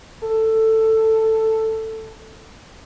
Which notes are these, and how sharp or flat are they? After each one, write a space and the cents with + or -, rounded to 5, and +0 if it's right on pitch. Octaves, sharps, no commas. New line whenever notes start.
A4 +10